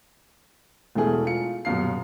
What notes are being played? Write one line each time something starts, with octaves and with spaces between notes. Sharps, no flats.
E1 B2 E3 A3 G#4
F4 C#7
D#1 F#2 B2 F5 C7